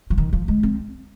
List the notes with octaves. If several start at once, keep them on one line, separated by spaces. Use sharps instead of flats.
F3
D#3
F3
G#3
C4